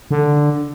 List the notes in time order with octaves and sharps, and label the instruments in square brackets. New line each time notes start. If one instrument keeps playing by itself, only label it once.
[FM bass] D3